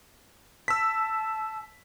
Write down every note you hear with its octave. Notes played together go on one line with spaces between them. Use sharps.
A5 E6 B6